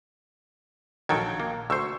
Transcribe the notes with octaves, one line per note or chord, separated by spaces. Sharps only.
A#1 D#3 F#3 A4 G5 G#6
A#3
D2 C5 C#6 E6